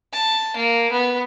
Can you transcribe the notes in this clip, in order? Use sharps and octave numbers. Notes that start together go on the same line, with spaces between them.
A5
A#3
B3